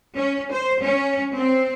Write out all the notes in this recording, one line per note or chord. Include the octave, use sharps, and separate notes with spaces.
C#4
C5
C#4
C4